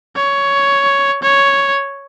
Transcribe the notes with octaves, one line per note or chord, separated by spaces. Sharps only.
C#5
C#5